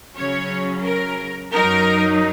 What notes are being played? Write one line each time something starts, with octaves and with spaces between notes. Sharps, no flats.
C#3 F#3 C#4 C#5
A#4
F#2 F#3 D#4 A#4